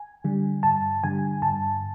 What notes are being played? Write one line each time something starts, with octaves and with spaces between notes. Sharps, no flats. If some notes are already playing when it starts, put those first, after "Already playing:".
Already playing: G#5
D3 G3
G2 A5
D3 G3 G#5
G2 A5